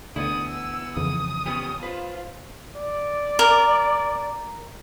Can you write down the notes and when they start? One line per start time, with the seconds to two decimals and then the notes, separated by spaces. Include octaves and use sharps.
0.16 D2 D3 B3 E4 D#6
0.48 E6
0.96 F2 C#3 E3 D#6
1.46 B3 C#4 G4
1.83 F4 B4 C5
2.77 D5
3.39 A#4